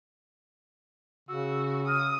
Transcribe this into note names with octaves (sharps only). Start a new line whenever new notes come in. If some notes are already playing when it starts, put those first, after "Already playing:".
C#3 F#4 E6
D#6 F6